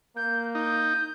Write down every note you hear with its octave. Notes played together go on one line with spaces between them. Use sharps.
A#3 G6
D#4 G6